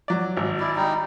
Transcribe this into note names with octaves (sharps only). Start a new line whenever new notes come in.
F#3 D5
G#1
E4 D5
G3 D#4